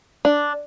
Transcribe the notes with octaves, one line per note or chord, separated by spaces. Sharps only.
D4